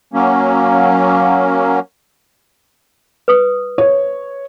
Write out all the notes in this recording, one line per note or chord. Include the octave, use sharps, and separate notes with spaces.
F#3 A#3 C#4
B4 D#6
C#5